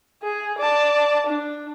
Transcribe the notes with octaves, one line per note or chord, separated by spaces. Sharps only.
G#4
D5 A5
D4